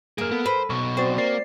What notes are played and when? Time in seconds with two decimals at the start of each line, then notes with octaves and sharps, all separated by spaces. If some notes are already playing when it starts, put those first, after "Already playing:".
0.18 F#2 A#3 G#4 A#4 D7
0.32 B3 A4
0.46 B4 C5
0.70 B1 B2 C#6
0.97 C4 F#4 C5 D5
1.18 A#3 D5 C7